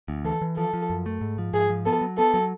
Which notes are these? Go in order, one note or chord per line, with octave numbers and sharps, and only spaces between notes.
D2
E3 A4
E3
F3 A4
F3
F#2
A3
G#2
F3
G#2 G#4
F3
B3 A4
F#3
B3 A4
F#3